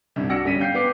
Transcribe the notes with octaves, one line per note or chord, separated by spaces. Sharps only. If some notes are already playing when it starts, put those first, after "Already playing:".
C2 G2
D4 F#4 F#5 E6 A#6 C#7
G1 G3 C#4 B6 D#7
F5 G5 G6 C7
B3 B4 D6 C7